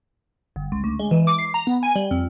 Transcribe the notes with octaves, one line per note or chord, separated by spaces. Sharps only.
G1
C#2
D2
G#3
E3
D6
C7
A#5
B3
G#5
G3
F2